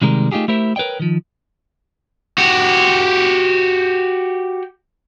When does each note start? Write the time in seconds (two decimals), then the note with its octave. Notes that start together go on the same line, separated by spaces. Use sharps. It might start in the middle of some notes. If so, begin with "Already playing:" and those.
0.02 C3 D#3 G3 G#3 A#4
0.32 A3 D#4 F4 G4 G#4
0.48 A3 E4 G4 A#4 C5 E5
0.76 A#4 B4 C#5 D#5 G5
1.00 D#3 F3
2.38 F#4 G4